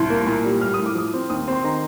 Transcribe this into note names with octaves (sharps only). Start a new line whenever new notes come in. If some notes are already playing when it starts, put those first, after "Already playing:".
Already playing: C2 C6
A#3
A#2
G3
A2 F6
D#6
A2
D6
F3 D#6
C4
D#2 D#6
C4 C6
D#3 A#5